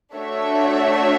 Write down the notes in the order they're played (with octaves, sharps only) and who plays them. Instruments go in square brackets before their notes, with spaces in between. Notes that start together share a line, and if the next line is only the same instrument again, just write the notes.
[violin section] A3 D4 F#4 C#5 E5